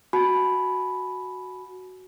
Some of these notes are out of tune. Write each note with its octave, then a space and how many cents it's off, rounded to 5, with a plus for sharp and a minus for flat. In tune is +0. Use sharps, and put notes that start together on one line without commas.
F#4 +0 G#5 +45 B5 +0